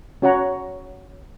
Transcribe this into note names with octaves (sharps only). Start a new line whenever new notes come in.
C#4 F#4 C#5 F#5 A#5